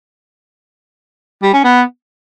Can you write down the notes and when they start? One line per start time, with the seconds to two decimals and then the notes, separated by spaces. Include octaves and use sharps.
1.43 G3
1.54 C#4
1.64 B3